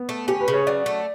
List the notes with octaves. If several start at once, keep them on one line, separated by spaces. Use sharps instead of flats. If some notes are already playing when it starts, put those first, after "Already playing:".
Already playing: B3
A3
C#4 G4
B4
C#3
C#5
F#3 D5
A3